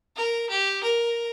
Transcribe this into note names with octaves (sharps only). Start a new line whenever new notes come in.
A#4
G4
A#4